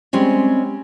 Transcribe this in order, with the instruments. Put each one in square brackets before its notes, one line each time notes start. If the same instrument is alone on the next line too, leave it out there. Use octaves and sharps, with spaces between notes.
[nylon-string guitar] G3 G#3 C4 C#4